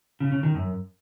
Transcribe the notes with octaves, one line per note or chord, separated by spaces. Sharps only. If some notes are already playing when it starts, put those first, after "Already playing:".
C#3
C#3
D#3
F#2